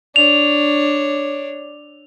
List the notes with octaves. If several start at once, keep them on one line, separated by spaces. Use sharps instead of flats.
D4 C#5 F7